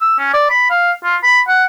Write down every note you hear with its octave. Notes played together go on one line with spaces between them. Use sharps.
E6
C#4
D5
B5
F5
F4
B5
F#5